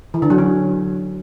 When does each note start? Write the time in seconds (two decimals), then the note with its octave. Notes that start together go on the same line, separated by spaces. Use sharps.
0.14 E3
0.22 D3
0.30 F#3
0.38 C#4